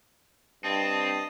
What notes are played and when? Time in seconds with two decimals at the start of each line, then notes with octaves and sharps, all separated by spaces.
0.64 G2 C4 D#5 A5 D#6